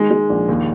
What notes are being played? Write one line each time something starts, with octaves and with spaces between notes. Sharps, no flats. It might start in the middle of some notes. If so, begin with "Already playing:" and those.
Already playing: D#3 G#3
G#3
A#1
D#2